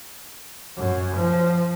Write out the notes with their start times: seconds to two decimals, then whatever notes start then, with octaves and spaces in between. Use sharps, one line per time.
0.77 F#2
1.17 F3